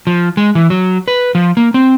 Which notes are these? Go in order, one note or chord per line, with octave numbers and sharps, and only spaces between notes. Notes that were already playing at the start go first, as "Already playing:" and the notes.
F3
G#3
E3
F#3
B4
F3
A#3
C4